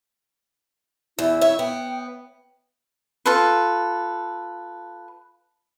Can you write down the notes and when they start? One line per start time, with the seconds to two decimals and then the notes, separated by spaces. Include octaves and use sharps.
1.19 E2 E4
1.41 C#5 E5
1.59 B3 G5
3.26 F4 A4 B4